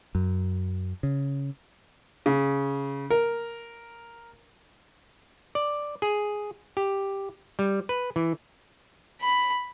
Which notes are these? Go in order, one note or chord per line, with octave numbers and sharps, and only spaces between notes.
F#2
C#3
C#3
A#4
D5
G#4
G4
G3
B4
E3
B5